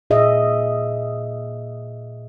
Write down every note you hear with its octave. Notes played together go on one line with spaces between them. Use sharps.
A#2 G#4 D#5 E5